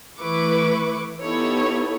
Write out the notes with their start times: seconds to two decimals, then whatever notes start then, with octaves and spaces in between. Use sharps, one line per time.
0.19 E3 A3 E4 B4 C#6 D6
1.21 B3 D#4 E4 G4 A4 C#5